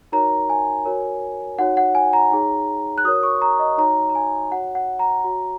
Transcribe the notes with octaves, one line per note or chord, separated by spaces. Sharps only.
D#4 F#4 A#4 C#5 A#5
G#5
F#4 A#4 C#5
D#4 F#4 C#5 F#5
F#5
G#5
A#5
D#4 G#4 C#5
F#6
F#4 A#4 C#5 D#6
C#6
A#5
D#5
D#4 F#4 C#5 A#5
A#5
G#5
F#4 C#5 F#5
F#5
A#5
F#4 C#5